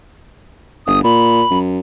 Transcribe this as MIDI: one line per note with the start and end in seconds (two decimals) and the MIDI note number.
0.87 1.04 31
0.87 1.00 87
1.04 1.43 46
1.04 1.59 83
1.51 1.80 42